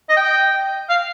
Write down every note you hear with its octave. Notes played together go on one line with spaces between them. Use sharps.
D#5
G5
F5